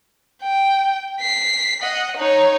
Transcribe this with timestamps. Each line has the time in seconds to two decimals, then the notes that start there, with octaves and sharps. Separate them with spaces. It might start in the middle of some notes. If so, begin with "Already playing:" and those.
0.42 G5
1.21 B6 C7
1.82 D#5 F#5
2.17 D#4 C#5